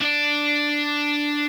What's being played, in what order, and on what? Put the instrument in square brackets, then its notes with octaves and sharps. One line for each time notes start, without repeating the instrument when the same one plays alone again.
[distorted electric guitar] D4 D5